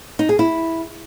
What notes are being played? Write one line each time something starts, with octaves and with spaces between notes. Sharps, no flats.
D#4
G#4
E4